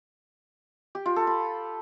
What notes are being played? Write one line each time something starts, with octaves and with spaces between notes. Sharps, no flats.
G4
F4
A4
B5